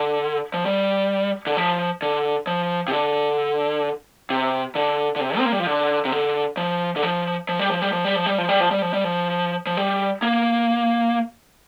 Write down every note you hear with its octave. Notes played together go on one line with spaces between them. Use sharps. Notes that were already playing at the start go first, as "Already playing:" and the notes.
Already playing: D3
F3
G3
D3
F3
D3
F3
C3
D3
C3
D3
D3
C3
C4
A#3
G3
F3
D3
C3
D3
F3
D3
F3
F3
G3
F3
G3
F3
G3
F3
G3
F3
G3
F3
G3
F3
G3
F3
F3
G3
A#3